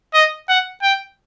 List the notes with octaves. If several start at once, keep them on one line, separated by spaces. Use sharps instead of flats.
D#5
F#5
G5